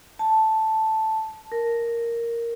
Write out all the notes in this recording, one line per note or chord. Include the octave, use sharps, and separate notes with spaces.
A5
A#4